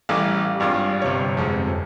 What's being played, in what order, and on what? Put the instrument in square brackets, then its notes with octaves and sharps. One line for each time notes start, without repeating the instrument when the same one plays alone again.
[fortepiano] A1 E3 [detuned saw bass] G3 [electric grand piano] F5 D6 D#6
[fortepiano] G#1 G2 F4
[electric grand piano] G1 C3 C#5
[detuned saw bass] F2 [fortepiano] G#2 F3